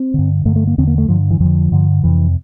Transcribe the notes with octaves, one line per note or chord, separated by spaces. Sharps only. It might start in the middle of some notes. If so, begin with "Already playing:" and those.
Already playing: C4
G2 D3
G2 D3 A3
A3
A#3
E2 D3 C4
A#3
A3
G2 D3 F3
E3
F2 D3 F3
G2 D3
F2 C3 E3